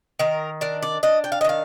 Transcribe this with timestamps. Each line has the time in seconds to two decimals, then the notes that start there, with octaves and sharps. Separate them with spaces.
0.19 D#3 A#4
0.61 D4 A#4
0.82 D5
1.03 D4 D#5
1.24 G5
1.32 F5
1.41 D#5
1.44 D#3 F5